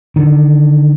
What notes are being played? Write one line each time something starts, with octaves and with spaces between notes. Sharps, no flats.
D3 D#3